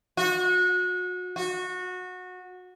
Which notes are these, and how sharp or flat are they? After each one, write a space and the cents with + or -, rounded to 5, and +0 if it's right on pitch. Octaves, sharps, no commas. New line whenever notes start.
F#4 -30
F#4 -20